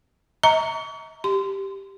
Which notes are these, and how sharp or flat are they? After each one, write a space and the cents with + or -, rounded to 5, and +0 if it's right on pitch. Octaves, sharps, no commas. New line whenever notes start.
D#5 +40 A#5 -10 C#6 +35
G4 +0 C6 -20